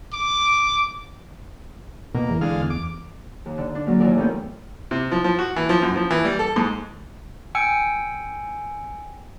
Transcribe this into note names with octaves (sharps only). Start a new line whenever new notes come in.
D6
B2 A#3
E2
D3 G#3 F5
D6
D#2
D3
D4
F#3 G#3 A#3 C#4
D#2 E3 E4 F4 A#4 D5
G#2 A3 B3 C#4 G#4 G5
C3
F3
F3
F#4
E3
F3
F#2
F3
E3
G3
A4
G#2
G5 G#5 E6 C#7